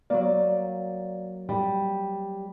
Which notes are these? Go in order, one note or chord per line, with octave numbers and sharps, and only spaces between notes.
F#3 A#3 D5
G3